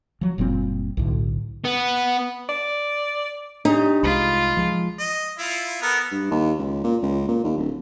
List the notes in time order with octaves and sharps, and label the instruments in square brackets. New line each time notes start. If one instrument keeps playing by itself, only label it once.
[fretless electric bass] F3 F#3
F#1 A#2 G3 C4
B1 A2 D3
[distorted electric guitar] B3
[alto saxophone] D5
[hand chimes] D4 G4 [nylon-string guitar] D#4
[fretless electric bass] C2 G#3 [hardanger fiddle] F4 [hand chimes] B5 B6
[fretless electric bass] F3 G#3
[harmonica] D#5
E4 F4
[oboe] B3 [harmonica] A4 A#4
[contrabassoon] G2
D#2
C#2
A#2
C#2
A#2
D#2
D1